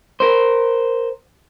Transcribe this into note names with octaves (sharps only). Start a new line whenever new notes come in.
A#4 C5